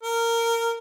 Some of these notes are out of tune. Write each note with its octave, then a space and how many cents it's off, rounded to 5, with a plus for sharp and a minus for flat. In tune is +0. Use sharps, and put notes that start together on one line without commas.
A#4 -15